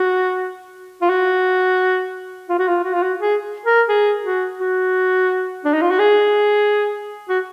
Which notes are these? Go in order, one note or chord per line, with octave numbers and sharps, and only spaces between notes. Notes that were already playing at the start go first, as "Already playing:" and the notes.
Already playing: F#4
F4
F#4
F4
F#4
F4
F#4
F4
F#4
G#4
A#4
G#4
F#4
F#4
D4
D#4
F4
F#4
G#4
F#4